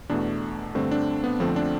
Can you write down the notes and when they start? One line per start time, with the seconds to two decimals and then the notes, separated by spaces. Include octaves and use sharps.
0.10 E2 B2 A3 D4
0.75 G2 D3 A3 C4
0.91 D4
1.24 B3
1.40 F2 D3 F3 A3 C4
1.56 D4